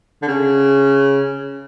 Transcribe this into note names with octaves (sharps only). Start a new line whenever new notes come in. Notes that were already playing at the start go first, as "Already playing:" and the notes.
D3
C#3